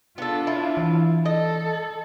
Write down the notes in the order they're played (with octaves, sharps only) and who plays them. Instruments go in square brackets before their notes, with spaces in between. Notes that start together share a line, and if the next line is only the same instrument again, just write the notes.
[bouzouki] B3 A4 [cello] D4 F4
[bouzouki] E4
[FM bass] E3
[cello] A4 [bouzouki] D#5